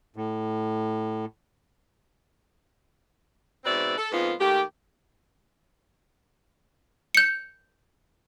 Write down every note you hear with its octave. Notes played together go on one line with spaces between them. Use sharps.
A2
G#2 B2 C4 B4 D5 E5
A4
F2 G#2 G#3 B3 F4 C5
D#3 A3 A#3 G4
G6 C#7